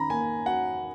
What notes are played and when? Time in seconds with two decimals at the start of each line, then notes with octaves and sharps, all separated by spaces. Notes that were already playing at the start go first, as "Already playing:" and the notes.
Already playing: D#3 C#4 A#5 B5
0.10 A#3 G#5
0.46 F#4 F#5